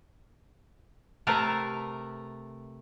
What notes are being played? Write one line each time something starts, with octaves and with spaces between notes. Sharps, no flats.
C3 A3 A#4 B4 A#5